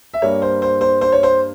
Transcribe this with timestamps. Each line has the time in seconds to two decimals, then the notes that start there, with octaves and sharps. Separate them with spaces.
0.14 E5
0.22 G2 G3 A#3 C#5
0.42 C5
0.62 C5
0.81 C5
1.01 C5
1.12 C#5
1.23 C5